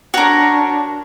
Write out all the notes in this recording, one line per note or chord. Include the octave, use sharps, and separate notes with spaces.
D4 F#4 A#4 C#5